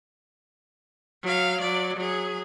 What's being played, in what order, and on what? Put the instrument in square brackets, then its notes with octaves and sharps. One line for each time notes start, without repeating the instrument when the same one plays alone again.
[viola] F#3 F5
F#3 D5
F#3 G#4